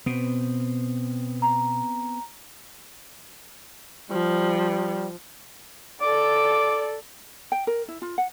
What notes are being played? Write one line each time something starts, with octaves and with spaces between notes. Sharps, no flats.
B2 B3 C4
A#5
F3 G3
A4 D5 D6
G5
A#4
E4
F4
F#5